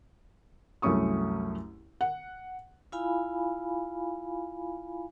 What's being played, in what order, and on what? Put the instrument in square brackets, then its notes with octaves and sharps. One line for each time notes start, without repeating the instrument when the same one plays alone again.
[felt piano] C2 F#2 A3 C#4 C#6 D#6
F#5
[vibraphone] E4 F4 F5 G#5 B5